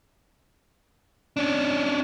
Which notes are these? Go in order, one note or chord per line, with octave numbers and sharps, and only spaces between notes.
C#4 D4